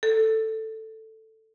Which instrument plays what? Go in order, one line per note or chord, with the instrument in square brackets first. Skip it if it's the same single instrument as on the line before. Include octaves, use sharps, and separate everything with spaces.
[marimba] A4